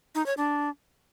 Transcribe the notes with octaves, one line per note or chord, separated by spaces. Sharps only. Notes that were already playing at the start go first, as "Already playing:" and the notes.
D#4
C#5
D4